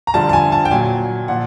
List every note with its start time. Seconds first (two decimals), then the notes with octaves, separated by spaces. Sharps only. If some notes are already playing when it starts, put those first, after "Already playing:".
0.07 A#5
0.14 G2 D3 F3 A5
0.29 A5
0.33 G#5
0.52 A5
0.65 G5
0.71 A#2 F#3 G#5
1.28 A#2 F3 F#5